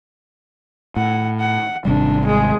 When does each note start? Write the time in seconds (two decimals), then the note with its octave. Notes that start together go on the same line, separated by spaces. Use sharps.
0.96 A2 F#5
1.40 F#5
1.85 G#1 C3 G3 D4
2.26 G#3 G#4